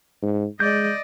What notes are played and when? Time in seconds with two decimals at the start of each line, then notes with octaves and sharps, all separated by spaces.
0.22 G#2
0.60 G#3 D5 D#5 G6